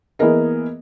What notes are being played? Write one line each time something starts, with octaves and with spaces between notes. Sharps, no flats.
E3 A#3 B3 G#4 A#4 D#5